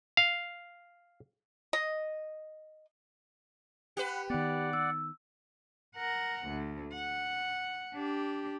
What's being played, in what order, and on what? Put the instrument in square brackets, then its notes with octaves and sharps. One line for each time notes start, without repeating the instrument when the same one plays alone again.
[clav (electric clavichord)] F5
[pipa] D#5
[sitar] G4 B4 [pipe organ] F#5
[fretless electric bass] D#3 B3 [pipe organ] D5 F#5
[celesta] E6
[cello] A#4 F#5
D2
F#5
D4 G4